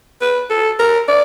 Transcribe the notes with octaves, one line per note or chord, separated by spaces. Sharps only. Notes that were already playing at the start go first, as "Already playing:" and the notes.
B4
A4
A#4
D5